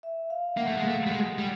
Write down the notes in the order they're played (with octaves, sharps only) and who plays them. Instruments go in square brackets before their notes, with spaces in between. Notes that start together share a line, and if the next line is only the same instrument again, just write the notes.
[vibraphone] E5
F5
[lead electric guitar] A#3 [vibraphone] F#5
[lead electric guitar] A3
G#3
A3
G3
G#3
G3